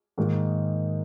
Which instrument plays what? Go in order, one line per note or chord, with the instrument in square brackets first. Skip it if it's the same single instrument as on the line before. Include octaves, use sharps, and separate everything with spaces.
[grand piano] G#2 D#3 A#3